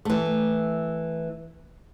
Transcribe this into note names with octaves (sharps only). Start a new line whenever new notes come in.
E3 A3